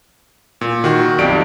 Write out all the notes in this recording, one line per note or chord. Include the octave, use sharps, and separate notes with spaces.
A#2
D#3 F#4
B1 F2 G4 D5 D7